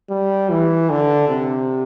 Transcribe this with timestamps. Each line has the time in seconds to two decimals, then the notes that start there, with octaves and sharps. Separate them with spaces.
0.10 G3
0.50 E3
0.90 D3
1.29 C3